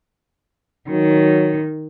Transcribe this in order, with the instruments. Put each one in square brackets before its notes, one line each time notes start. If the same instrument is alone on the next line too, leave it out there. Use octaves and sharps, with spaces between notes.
[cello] D#3 [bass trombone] F#3